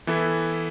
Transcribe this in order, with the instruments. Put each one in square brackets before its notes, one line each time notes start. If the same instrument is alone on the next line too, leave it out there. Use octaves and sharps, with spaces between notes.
[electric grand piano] E3 B3 E4 A4